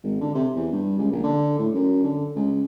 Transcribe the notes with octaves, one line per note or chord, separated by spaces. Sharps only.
G#1
D3
C3
E2
G2
C#2
A#1
D3
A2
F#2
D3
C#2